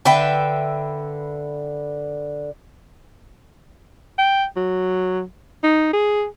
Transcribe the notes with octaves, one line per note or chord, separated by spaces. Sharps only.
D3 B4 E5 G5
G5
F#3
D#4
G#4